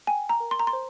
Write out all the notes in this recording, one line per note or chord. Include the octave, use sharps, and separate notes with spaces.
G5 G#5
A#5
A#4
C6
A#5
C6
C5